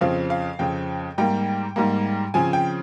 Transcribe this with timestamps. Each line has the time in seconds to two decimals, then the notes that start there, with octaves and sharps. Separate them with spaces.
0.01 F2 C#3 F3 C4 F5
0.30 F5
0.59 F2 C#3 F3 C4 G5
1.18 G#2 G3 A#3 G5
1.76 G#2 G3 A#3
2.34 C#3 F3 C4 G#5
2.53 G5